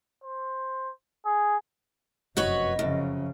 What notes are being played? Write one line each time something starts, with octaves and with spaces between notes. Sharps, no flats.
C5
G#4
F1 F#2 F#4 B4 C#5 D#5
F#2 C#3 F3